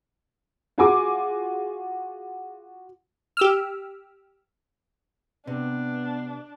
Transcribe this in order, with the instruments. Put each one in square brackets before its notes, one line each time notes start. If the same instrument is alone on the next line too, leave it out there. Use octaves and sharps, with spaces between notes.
[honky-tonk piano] F4 F#4 G#4 G#5 C6 D6
[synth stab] G4 E6 F6
[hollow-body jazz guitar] C3 [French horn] B3 [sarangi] D4